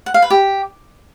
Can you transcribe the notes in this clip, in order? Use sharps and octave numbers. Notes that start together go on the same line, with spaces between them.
F#5
F5
B4
G4